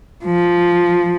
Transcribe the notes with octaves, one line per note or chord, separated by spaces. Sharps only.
F3